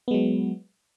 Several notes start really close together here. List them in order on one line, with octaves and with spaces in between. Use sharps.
B3 G#3 F#3